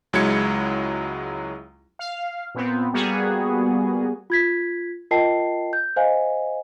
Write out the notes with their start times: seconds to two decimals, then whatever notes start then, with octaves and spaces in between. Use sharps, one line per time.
0.13 C#2 F#3 G#3 E4 G#6 C#7
1.99 F5
2.55 A#2 B3 C4
2.93 G3 A#3 B3 F#4 G#4
4.30 F4 G#6 B6
5.11 F4 A#4 D#5 G5 A5 C7
5.73 G6
5.96 C5 D#5 F5 G#5